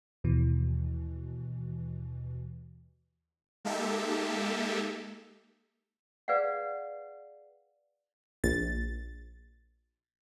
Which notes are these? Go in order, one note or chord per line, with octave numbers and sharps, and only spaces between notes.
D#2 B2 E3
G#3 A#3 D#4 G4 A4 E5
G#4 B4 D5 F5 F#5
A#1 A6